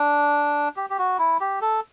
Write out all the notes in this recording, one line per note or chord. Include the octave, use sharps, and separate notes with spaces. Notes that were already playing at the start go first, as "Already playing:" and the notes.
Already playing: D4
G4
G4
F#4
E4
G4
A4